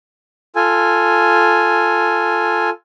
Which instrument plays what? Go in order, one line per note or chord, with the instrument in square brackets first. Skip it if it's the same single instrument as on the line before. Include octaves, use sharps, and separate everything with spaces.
[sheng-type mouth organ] F4 A4 G#5